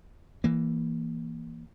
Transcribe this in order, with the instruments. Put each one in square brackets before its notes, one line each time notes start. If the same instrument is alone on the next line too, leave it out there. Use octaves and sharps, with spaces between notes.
[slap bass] E3 A#3